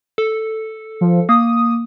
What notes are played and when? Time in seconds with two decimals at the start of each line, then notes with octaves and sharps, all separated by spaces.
0.18 A4
1.01 F3
1.29 A#3 D#6